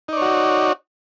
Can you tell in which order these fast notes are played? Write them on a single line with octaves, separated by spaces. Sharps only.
D#4 D5 C#5 F#4